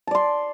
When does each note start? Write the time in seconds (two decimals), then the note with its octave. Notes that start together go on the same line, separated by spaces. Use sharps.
0.07 A5
0.11 D5
0.15 C6